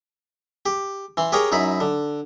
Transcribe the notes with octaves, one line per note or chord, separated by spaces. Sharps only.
G4
E3 C6
G4 G#4 A#4 C#5 G5
F#2 D#4 E4 B5
D3